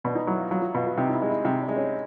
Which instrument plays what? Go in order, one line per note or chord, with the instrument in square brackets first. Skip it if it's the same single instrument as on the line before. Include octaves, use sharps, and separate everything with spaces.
[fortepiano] B2 [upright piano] D4
[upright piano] D#4
[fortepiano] F#3 [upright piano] E4
[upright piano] F4
[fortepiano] F#3 [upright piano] F4
[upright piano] F#4
[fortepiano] B2 [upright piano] F4
[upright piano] F#4
[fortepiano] C3 [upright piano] D#4
[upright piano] D#4
E4
[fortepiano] G#3
[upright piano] E4
[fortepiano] C3 [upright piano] D#4
[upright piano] D4
[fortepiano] G#3
[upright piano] C#4